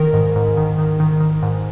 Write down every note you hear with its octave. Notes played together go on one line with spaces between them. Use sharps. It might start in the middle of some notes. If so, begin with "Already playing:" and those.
Already playing: D#3 A#4
G#2
G#2
D#3
D#3
D#3
D#3
G#2